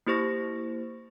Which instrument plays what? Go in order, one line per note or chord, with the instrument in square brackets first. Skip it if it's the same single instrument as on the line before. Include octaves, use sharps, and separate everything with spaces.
[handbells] A#3 E4 G4 C5 C#6 A#6